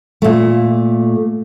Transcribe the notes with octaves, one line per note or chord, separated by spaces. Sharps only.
A#2 A3